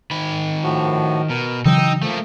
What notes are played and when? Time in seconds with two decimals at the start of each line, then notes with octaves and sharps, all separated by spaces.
0.11 D#3 B5
0.64 A2 F3 F#4
1.30 B2 A#4
1.65 C#3 E3 F#3 D#4 G5 D#6 E6
2.03 F3 A3 A#3